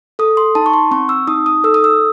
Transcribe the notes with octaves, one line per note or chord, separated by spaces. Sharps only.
A4 D#6
C6
D#4 A5
C#6
C6
C4 C#6
E6
D#4 D#6
D#6
A4 E6
D#6
E6